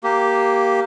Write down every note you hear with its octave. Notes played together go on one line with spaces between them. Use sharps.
A#3 G4